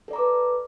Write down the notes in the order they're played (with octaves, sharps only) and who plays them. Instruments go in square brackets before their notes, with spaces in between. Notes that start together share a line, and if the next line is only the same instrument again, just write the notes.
[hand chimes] A4
D5
A#5
D6
B4